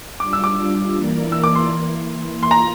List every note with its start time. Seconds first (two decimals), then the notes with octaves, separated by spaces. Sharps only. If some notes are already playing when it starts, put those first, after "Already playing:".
0.20 G3 D4 F4 D6
0.33 E6
0.44 D6
0.94 E3 A#3 E4 A#4 D5
1.32 E6
1.44 D6
1.55 C6
1.68 E3 A#3 E4
2.42 A#3 F4 C6
2.51 A#5